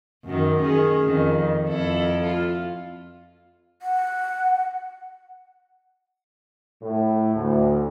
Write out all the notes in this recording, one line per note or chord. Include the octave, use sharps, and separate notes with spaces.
F#2 D#3
D#3 C#4 G#4
F2 D#3
F2 E4 A4
F4
F#5
A2
D2